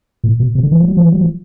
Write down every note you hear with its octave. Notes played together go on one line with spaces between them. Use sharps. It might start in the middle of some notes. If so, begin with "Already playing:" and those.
A#2
B2
C3
D3
E3
F3
F#3
F3
E3
F#3
F3